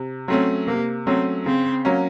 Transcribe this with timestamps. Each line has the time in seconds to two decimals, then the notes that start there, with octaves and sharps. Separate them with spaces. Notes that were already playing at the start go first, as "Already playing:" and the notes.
Already playing: C3
0.28 F#3 A3 C4 C#4
0.67 C3 A#3
1.06 F#3 A3 C4 C#4
1.46 C#3 C4
1.85 F#3 A#3 C#4